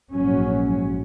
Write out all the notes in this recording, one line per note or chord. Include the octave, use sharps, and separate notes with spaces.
A#1 G#2 F#3 C#4